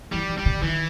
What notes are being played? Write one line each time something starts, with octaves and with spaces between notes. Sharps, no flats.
E3 G3
D#3
G3
C#3
D#3 E3